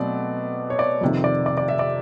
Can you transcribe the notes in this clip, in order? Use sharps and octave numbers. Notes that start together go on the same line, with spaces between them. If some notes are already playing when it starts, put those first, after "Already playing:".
Already playing: B2 F#3 A3 C4 D5
C#5
D5
F2 C3 D#3
D5
D5
D5
E5
D5